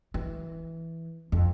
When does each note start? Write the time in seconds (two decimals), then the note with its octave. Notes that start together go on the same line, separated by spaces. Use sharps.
0.14 E3
1.32 F2